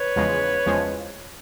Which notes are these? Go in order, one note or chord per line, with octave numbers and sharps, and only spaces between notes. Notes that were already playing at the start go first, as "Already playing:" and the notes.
Already playing: B4 C#5
E2 C#3 F3 G#3
E2 C#3 F3 G#3